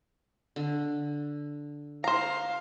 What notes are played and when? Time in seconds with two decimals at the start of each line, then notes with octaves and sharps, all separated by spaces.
0.56 D3
2.04 C5 F5 A#5